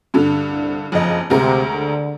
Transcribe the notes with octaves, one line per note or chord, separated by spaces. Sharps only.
G2 D3
C2
F#1 F2 F3 D#5
D2 C3 G#3 A#4
D3